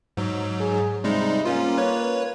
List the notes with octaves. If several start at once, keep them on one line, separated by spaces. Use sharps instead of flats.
G#2 F#3
G#4
C3 G3 G#3 D#4
A#3 C#4 F4
B4 C#5